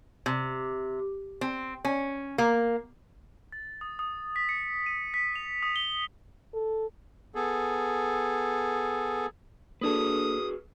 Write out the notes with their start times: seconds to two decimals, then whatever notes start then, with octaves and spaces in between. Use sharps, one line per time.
0.26 C3
1.41 C4
1.85 C#4
2.38 A#3
3.52 A6
3.81 D#6
3.99 D#6
4.36 B6
4.49 C#7
4.86 D#7
5.14 B6
5.36 F7
5.63 D#6
5.76 G7
6.54 A4
7.35 B3 G#4 A4
9.81 A#3 D4 F#4 G#4 A4 B4 D#6